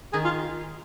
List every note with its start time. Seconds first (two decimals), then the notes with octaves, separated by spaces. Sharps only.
0.13 D#3 G#4
0.24 F4